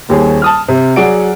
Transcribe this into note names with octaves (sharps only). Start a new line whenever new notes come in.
D#1 D#2 G4 G#4 C#5
A5 D#6 F6
C3
F#3 G#4 D5 F#5 D7